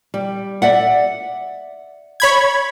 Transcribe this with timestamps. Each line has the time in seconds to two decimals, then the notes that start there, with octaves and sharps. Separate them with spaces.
0.14 G3
0.62 D5 E5 F#5
2.20 C#5 B5 G#6